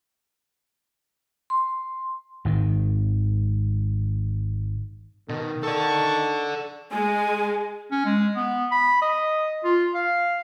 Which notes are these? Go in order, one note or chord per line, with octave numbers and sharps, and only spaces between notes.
C6
G#1 D#3
B2 D#3
A4 D5 A5 C#6
G#3 G#5
C#4
G#3
B3
B5
D#5
F4
F5